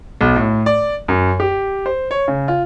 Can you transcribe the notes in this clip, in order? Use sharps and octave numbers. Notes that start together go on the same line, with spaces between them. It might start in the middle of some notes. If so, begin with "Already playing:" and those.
B1
A2
D5
F#2
G4
C5
C#5
C#3
F4